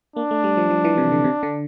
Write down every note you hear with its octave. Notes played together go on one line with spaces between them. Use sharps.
A#3 D4
A3
G3
F3
F3
E3
C3
D3
C3
D3